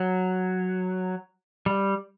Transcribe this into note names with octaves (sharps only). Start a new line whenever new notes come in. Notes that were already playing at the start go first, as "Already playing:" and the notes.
Already playing: F#3
G3